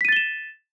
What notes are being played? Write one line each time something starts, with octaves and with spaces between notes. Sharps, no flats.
A6 B6 D#7 E7 G7